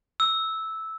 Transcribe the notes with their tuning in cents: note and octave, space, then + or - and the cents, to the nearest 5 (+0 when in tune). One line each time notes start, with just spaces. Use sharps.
E6 -10